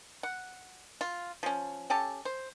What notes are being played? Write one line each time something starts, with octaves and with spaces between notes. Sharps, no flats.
F#5
F4
F3 C#4
C#4 G4 A4 A5
C5